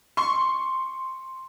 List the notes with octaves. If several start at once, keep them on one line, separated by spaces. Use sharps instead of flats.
C6 C#6